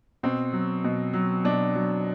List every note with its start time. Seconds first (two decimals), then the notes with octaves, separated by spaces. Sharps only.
0.23 B2 C4
0.53 F#3
0.84 B2
1.13 F#3
1.44 B2 D4
1.75 F#3